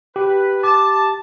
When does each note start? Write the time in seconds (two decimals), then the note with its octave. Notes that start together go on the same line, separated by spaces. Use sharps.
0.16 G4 B4
0.63 A5 D6